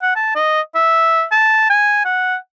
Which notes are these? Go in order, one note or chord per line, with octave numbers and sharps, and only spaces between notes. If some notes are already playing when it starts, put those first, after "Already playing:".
F#5
A5
D#5
E5
A5
G#5
F#5